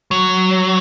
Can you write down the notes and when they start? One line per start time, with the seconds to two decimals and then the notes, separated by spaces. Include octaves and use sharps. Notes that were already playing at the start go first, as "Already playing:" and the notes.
0.11 F#3